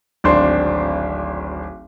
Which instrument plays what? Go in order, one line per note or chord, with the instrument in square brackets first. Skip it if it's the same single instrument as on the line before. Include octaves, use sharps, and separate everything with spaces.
[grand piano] D1 G#1 D4 C5 C6